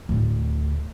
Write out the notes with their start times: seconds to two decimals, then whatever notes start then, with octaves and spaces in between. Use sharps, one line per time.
0.09 D2 A2